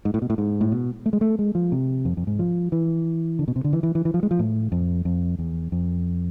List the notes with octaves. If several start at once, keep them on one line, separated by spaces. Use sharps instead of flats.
G#2
A2
B2
A2
G#2
A2
B2
A3
G#3
A3
G#3
F3
C3
F2
F2
G#2
F3
E3
D3
B2
C3
D3
E3
E3
E3
E3
F3
G#3
F3
A2
F2
F2
E2
F2